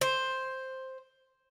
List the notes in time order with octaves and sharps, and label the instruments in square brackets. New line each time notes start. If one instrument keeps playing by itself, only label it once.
[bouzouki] C5